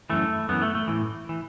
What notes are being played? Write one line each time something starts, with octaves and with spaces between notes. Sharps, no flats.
F#2 E3 A3
F#2 E3 B3
A3
A3
A2 E3
E3